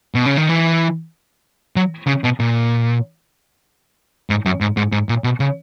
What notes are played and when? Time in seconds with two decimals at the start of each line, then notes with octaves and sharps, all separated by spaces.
0.15 B2
0.26 C#3
0.37 D#3
0.49 E3
1.76 F#3
2.07 C#3
2.24 B2
2.40 A#2
4.30 G#2
4.46 F#2
4.61 G#2
4.77 G#2
4.92 G#2
5.09 A#2
5.24 B2
5.40 C#3